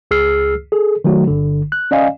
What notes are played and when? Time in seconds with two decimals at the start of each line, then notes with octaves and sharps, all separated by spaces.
0.11 C#2 G#4 E6 F6 C7
0.72 G#4 A4
1.04 D#3 F#3 A3 F#4
1.27 G1 D3
1.72 F#6
1.91 C#4 D5 D#5 F5 G#5